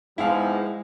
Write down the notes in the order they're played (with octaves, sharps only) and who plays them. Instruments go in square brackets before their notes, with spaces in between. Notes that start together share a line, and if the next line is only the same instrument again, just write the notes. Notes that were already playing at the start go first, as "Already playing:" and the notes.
[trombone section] G#2 F3 B3 [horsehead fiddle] G#3 [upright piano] E4 F5